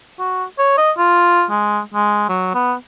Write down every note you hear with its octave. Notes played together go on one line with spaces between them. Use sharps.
F#4
C#5
D#5
F4
G#3
G#3
F#3
B3